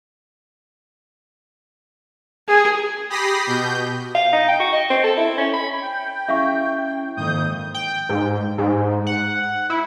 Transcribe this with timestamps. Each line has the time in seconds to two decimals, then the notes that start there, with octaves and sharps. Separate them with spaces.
2.48 G#4
3.10 G4 B5 D#6 A#6 C7
3.47 B2 G6
4.15 F5
4.33 D#4
4.49 G5
4.60 F#4
4.73 D#5
4.90 C4
5.04 A4
5.17 E4
5.38 C#4
5.54 B5
5.82 G5
6.28 C#4 E4 G#4 E5 F5 C#6
7.17 F2 G#2 D#3 A#3 D#6 G6
7.74 G5
8.09 G#2
8.58 G#2
9.07 F#5
9.70 E4